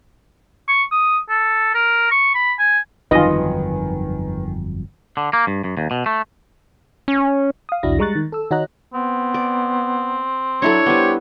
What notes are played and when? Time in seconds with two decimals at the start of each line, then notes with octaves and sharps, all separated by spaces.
0.68 C#6
0.91 D#6
1.29 A4
1.74 A#4
2.11 C#6
2.35 B5
2.59 G#5
3.11 G1 F2 D#3 F#3 F4 B4 D#5 G#5
5.17 D3
5.33 A#3
5.47 G2
5.64 F#2
5.77 D#2
5.91 B2
6.06 A3
7.08 C#4
7.69 F5 D#6
7.83 B1 E2 D4 E4 F#4 A#6
7.99 G3 G#3 A#5 C#6 F#6 A6
8.15 D#3
8.32 A4 E6
8.51 D#3 F#4 C#5 D#5 A#5 F#6
8.94 B3 C4
9.34 D5
10.62 F#3 D4 E4 A4 C#5
10.86 G3 B3 G4 C5